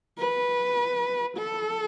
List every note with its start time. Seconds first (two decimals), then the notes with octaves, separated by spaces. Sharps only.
0.18 B4
1.37 A4